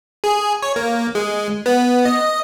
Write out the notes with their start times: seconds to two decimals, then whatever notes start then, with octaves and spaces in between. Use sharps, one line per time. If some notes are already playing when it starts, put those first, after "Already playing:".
0.24 G#4
0.62 C#5
0.76 A#3
1.15 G#3
1.66 B3
2.05 D#5